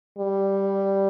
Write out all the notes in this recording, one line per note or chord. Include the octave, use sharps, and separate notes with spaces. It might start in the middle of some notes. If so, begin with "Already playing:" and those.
G3